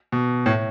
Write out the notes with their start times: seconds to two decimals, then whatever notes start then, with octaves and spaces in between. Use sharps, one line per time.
0.12 B2
0.46 A2